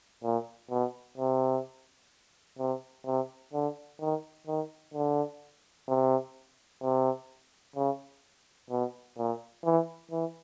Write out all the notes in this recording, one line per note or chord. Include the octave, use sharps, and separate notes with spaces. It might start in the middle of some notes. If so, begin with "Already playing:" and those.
A#2
B2
C3
C3
C3
D3
D#3
D#3
D3
C3
C3
C#3
B2
A#2
E3
E3